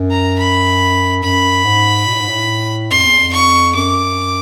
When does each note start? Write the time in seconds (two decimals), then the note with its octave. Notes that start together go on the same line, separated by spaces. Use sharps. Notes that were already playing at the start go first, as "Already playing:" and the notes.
Already playing: F#2
0.11 A#5
0.38 B5
1.23 F#2 B5
1.64 G#2
2.06 A#2
2.14 A2
2.21 G#2
2.29 A2
2.91 F2 C6
3.05 E2
3.19 F2
3.33 C#6
3.75 F#2 D6